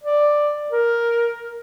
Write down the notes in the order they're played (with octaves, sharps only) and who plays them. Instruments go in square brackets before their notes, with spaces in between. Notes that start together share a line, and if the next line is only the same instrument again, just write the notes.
[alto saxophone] D5
A#4